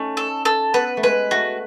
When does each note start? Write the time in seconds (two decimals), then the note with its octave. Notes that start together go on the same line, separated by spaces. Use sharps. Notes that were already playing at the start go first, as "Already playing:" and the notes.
Already playing: A3 C#4 D#4
0.17 A4
0.45 A4
0.74 B3 B4
0.97 A3
1.03 G#3 B4
1.31 A3 F#4